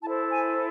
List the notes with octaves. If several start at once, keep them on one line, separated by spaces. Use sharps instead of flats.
E4 A4 C5 A5
G#5